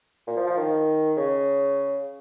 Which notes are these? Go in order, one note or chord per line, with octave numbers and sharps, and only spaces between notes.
A#2
F3
F3
D#3
C#3